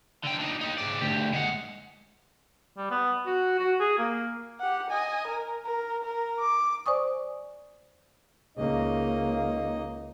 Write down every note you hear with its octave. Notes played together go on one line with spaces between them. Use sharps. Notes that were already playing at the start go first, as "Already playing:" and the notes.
D3 G5
D4 D#4
D#4 G4
G#2 D5
D2 G4
G#3 F#5
G3
B3
F#4
F#4
G#4
A#3
G4 F#5
D#5 G#5
A#4
A#4
A#4
D6
C5 D5 G#5 C#6 D#6
C#2 A#3 D#4 D#5